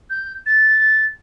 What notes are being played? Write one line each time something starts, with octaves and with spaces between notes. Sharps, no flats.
G6
A6